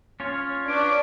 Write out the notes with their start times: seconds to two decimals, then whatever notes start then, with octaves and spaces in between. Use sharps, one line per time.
0.20 C#4 F4 C#5
0.68 D4 B4 C#6 D6